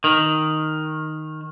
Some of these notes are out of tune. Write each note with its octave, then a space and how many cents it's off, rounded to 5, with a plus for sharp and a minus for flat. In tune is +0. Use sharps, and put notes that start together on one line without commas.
D#3 +0